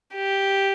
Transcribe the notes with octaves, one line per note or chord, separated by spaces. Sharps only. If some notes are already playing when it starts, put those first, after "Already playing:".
G4